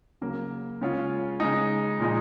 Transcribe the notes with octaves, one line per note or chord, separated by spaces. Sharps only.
C#3 F#3 A#3
C#3 G#3 C#4 F4
C#3 G#3 D#4
A#2 F3 G#3 D#4